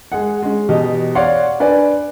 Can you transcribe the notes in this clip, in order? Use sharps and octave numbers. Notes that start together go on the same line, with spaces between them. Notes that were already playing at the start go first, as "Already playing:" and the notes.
G#3 G#4 F#5
G#3 C#4
E2 B2 G4 D#5
C#5 D5 F5 F#5 C6
D4 B4 D5 G#5